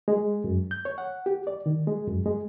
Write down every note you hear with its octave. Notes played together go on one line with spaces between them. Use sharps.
G#3
F#2
G6
C#5
F#5
G4
D5
D#3
G#3
F#2
G#3